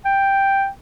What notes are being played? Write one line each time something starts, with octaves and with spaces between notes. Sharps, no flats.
G5